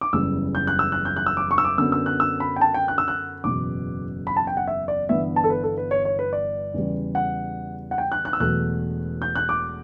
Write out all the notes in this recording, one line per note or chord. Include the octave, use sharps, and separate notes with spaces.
D6
F#1 E2 C#3 E3 G3 E6
G6
F#6
E6
F#6
G6
F#6
E6
D6
C#6
E6
D6
F#2 D3 F#3 B3 E6
E6
F#6
E6
B5
G5
A5
G5
F#6
E6
F#6
F#1 E2 B2 D6
B5
A5
G5
F#5
E5
D5
G1 G2 E3 B3 E5
A5
A4
B4
A4
B4
C#5
C#5
B4
D5
E2 C#3 G3
F#5
F#5
G5
F#6
F#6
E6
E1 E2 B2 F#3 A3 F#6
G6
F#6
D6